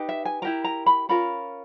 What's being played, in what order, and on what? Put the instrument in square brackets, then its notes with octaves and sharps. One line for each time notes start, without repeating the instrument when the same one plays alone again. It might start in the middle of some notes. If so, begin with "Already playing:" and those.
Already playing: [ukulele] D#4 G4 B4
E5
G#5
E4 G4 A#4 A#5
A#5
B5
C#4 F4 A#4 B5